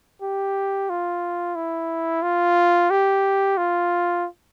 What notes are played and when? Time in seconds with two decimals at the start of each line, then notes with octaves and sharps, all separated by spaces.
0.22 G4
0.90 F4
1.55 E4
2.22 F4
2.90 G4
3.57 F4